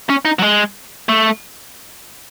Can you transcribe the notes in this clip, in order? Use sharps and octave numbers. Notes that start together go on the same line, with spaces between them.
C#4
D#4
F#3
G#3
A3